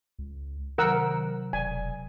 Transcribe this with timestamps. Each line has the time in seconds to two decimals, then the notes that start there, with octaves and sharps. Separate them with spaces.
0.19 C#2
0.78 C3 D#3 F#3 A#4 F#5 E6
1.53 E1 D5 G#5